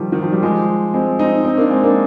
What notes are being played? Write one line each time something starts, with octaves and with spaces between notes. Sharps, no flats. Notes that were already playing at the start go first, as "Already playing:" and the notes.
Already playing: D#3 F3 G3
D#3
F3
G3
F3 G#3
G#3 C4
C4 D#4
C4 D#4
A#3 D4
G#3 C4
A#3 D4